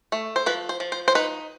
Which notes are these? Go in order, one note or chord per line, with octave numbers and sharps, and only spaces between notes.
A3
C5
F3 B4
C5
F3
C5
C5
D#4 B4